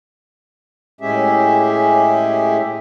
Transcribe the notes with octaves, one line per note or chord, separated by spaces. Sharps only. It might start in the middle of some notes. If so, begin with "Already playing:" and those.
A2 G#3 C#4 G4 G#4 E5